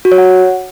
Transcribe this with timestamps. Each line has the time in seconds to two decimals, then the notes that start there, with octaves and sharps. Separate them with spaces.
0.05 F#4
0.12 C#5
0.18 F#5